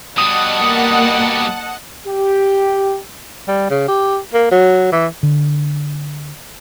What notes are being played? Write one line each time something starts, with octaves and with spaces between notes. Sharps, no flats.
B2 G3 D#5 F#5 A5 D#6
A#3
G4
G3
C#3
G4
A#3
F#3
E3
D3